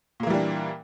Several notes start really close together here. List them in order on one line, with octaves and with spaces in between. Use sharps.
A#2 A#3 E3 G3 D4